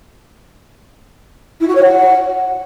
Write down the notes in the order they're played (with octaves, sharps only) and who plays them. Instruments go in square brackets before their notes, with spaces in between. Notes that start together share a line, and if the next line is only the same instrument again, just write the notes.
[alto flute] E4
F#4
C#5
F#5